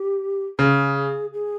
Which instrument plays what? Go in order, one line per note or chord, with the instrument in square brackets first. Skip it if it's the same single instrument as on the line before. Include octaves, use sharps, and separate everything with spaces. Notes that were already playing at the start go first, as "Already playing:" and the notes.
Already playing: [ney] G4
[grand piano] C#3 [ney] G#4
[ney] G#4